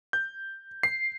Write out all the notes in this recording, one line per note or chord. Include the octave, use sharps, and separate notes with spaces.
G6
C7